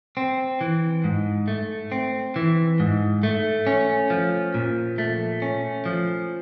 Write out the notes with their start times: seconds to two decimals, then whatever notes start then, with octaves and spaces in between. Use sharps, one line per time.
0.17 C4
0.61 E3
1.04 G#2
1.48 A3
1.92 C4
2.36 E3
2.80 G#2
3.23 A3
3.67 C#4
4.10 F3
4.54 A#2
4.98 A3
5.42 C#4
5.86 F3